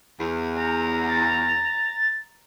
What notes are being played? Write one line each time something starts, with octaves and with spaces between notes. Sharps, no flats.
E2
A#5
A6